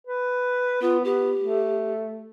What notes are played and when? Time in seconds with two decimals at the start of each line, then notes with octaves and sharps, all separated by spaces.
0.07 B4
0.82 B3 F4
1.05 B3 G4
1.39 A3